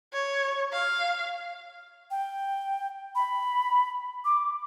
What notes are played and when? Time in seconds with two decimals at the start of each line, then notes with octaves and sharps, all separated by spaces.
0.13 C#5
0.72 F5
2.11 G5
3.15 B5
4.25 D6